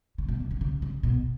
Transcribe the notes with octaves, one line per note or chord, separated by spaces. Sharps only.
C#3
B2
C#3
D3
C#3
C#3
B2